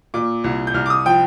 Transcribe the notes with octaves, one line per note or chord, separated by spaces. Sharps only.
A#2 D6
C2
G6
C2 F6
D6
D#6
F3 G5